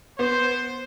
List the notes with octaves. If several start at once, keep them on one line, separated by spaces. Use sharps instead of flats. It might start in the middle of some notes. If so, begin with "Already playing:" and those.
B3 C5